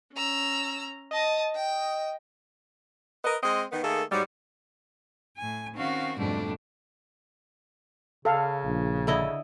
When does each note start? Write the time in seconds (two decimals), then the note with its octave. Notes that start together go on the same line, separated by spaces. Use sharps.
0.13 C#4 A#5 E6
1.11 D#5 A5 D#6
1.56 G5
3.24 A#4 B4 D#5
3.43 G#3 C4 D#5
3.72 D#3 B3
3.83 D#3 A3 A#3 G#4 A4
4.11 G#2 F#3 G3
5.37 A2 G#5
5.74 D#3 C4 C#4 F#4 F5
6.16 F2 G#2 B2 G3 A3 D4
8.25 C#3 A4 F5
8.64 A#1
9.07 D3 E4 D#5